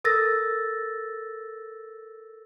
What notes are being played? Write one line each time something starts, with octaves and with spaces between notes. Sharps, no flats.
A4 A#4 E6 A6 A#6